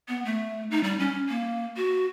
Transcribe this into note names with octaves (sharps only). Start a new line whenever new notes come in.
B3
A3
D#4
G3
C#4
A#3
F#4